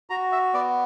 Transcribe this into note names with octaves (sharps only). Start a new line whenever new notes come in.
F#4 A#5
E5
B3 D5